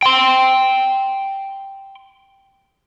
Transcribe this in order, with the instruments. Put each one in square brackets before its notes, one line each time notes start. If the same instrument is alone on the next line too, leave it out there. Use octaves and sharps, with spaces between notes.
[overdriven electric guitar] G5 C6